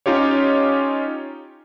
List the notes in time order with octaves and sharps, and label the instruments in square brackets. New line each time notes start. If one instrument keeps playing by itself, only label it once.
[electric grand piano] C#4 D#4 F4 G4 C#5